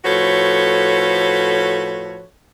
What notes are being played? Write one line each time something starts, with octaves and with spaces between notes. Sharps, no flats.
A2 F3 F#4 A4 B4 C#5